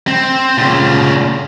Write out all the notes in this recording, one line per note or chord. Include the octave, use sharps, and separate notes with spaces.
C4
A#2 C#3